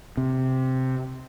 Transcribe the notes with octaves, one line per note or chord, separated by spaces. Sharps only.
C3